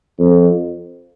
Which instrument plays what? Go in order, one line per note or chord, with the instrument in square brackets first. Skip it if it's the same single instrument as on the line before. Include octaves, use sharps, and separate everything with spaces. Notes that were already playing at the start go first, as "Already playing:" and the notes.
[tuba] F2